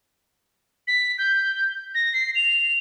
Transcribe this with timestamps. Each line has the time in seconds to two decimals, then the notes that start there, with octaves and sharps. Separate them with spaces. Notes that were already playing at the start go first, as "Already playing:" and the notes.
0.87 B6
1.18 G6
1.95 A#6
2.13 C7
2.35 F7